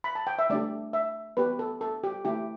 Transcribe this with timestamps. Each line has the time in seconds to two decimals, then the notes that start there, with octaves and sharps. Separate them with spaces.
0.04 B5
0.15 A5
0.27 G5
0.39 E5
0.50 A3 D4 G4 D5
0.93 E5
1.37 B3 G4 B4
1.59 A4
1.81 A4
2.04 G4
2.25 A3 E4 G4